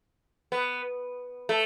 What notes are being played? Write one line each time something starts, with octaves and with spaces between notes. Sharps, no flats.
B3
A3